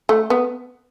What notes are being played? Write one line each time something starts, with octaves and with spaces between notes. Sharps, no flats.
A3
B3